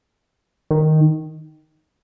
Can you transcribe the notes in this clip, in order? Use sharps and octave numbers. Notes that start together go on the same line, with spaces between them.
D#3